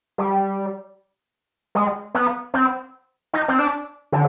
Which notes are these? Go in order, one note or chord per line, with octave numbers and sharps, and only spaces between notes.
G3
G#3
B3
C4
D#4
C4
D4
D3